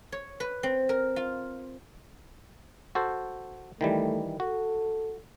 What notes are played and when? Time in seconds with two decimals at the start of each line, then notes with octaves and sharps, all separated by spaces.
0.12 C#5
0.40 B4
0.63 C4
0.89 A#4
1.16 F4
2.95 F#4 A4 C5
3.81 D#3 E3 G3 A3
4.40 F#4 A4